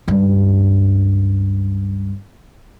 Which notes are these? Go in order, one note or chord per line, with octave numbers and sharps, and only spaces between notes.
C#2 G2